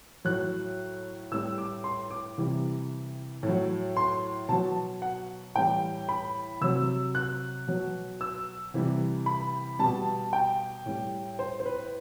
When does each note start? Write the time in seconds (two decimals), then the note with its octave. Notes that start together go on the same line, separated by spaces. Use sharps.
0.25 A2 F#3 F#6
1.32 A2 G3 E6
1.58 D6
1.84 C6
2.11 D6
2.38 C3 E3 G3
3.43 A2
3.48 F#3
3.97 C6
4.49 B2 F#3 A5
5.02 F#5
5.56 A2 E3 G3 G5
6.09 B5
6.61 C3 F#3 E6
7.15 F#6
7.67 B2 F#3
8.21 E6
8.74 C3 E3 G3
9.26 B5
9.79 B2 G3 A5
10.33 G5
10.86 A2 G3
11.39 C5
11.60 C5
11.66 B4